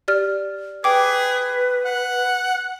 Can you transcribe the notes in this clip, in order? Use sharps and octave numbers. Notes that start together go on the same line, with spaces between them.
G4 D5 F6
G#4 B4 G5 D6
F#5